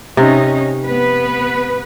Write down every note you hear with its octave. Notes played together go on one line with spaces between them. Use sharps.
C3 C#4 D#4
B3 B4